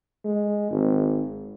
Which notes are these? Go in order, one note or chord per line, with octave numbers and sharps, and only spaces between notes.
G#3
G#1